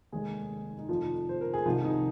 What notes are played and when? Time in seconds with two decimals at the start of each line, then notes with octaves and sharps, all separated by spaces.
0.12 F1 D#2 D#3 G#3 G#4
0.79 D#4
0.89 F1 F2 D#3 F3 F4
1.29 C5
1.41 A#4
1.54 G#4
1.65 C2 C3 D#3 F3 F4
1.84 D#4